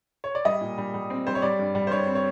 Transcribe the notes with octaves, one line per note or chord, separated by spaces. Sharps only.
C#5
D5
G3 D#5
A#2
G3
G3
C4
G3 C5
C#5
G3 D5
G2
G3
C5
G2 C#5
C4
C#5